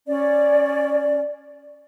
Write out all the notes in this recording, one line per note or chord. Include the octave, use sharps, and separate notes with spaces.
C#4 D5